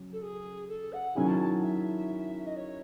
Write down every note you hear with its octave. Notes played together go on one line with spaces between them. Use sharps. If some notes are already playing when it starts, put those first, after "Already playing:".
Already playing: C#3 F#3 C#4
A4
G#4
A4
F#5
D#3 F#3 C#4 E4 G#4 G#5
A5
A5
E5
D#5
C#5